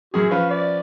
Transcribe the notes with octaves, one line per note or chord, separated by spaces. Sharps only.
F#2 F#4 G#4
F3 C#4 B4 F5
D5